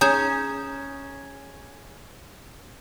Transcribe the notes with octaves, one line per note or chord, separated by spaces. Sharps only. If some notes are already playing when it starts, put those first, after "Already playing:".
C#4 G#4 A#5 G6 E7